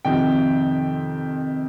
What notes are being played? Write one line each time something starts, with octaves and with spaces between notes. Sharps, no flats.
F2 C3 D#3 G5